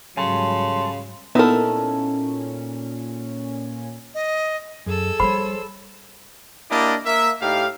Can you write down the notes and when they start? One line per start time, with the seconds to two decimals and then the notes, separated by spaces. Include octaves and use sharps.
0.17 G#2 C#3 F#3 G3 A4 G#5 C6
1.35 A#2 B3 C#4 D#4 E4 A4 A#4
4.15 D#5
4.86 F#2 G#4 A4 E6
5.20 F3 G3 C5 C#5 B5
6.70 A#3 D4 E4 G4 D5 D#5
7.05 A#3 E5
7.41 A2 D#4 G4 F5